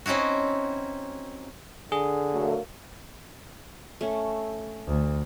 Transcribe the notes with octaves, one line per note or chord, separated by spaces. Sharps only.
C4 C#4 D#4 E4 F#4
D3 G#4
F#3 A3 A#3
A3 C#4
D2